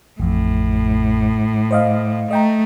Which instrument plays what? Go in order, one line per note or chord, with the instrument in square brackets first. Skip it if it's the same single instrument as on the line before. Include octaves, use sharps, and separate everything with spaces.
[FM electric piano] A1 F2 [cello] A2
[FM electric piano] C5 D#5 F5
[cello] A3 [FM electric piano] D#5 G5 A#5